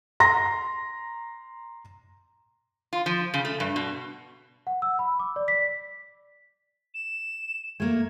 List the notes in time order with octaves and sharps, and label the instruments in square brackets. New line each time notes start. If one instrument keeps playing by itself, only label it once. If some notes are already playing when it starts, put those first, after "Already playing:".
[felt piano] A#5 C6 A#6
[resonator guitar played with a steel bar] F4
F3
C#3
A3
G2
B2
[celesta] F#5
E6
B5
D6
D5
B6
[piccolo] E7
[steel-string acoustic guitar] A3 A#3 [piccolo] G#6